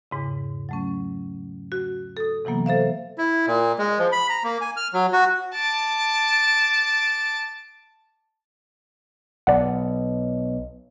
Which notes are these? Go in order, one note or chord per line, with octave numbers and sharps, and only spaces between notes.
E2 G#2 C#3
F#3 A3 C#4
F#4
A4 D#6
C3 E3 F#3 A#3 B3
A4 C5 E5 F5
E4
A#2
G#3
F3
B5
A#5
A#3
G#5
F6
F#3
F#4
A5 D6
B1 D5 F#5